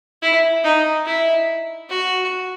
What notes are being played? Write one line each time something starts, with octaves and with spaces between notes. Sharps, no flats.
E4
D#4
E4
F#4